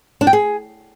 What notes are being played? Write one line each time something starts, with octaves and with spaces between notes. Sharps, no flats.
D4
G5
G#4